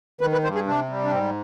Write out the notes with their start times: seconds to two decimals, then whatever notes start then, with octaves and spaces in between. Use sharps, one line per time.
0.21 D#3 B4
0.32 B4
0.44 G2 C5
0.55 G#4
0.66 C3 D4
0.89 G3
1.04 D4
1.11 G#2 C4